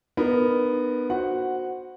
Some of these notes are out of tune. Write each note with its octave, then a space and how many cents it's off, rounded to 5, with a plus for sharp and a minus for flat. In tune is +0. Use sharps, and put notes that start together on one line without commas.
B3 +0 D#4 -45 A#4 +0
F#4 -10 C5 +0 F#5 +0